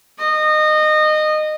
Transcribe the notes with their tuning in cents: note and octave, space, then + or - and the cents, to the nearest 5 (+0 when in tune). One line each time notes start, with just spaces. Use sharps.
D#5 -20